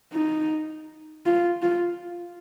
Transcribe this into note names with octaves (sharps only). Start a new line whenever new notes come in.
D#4
F4
F4